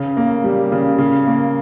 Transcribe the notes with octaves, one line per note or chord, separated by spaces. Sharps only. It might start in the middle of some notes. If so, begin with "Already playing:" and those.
Already playing: C#3
A#3
G3
C#3
C#3
A#3